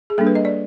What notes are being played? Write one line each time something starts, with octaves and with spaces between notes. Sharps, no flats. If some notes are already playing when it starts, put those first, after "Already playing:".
G#4
G3 A#3 D4 A4
B4
D#5
D5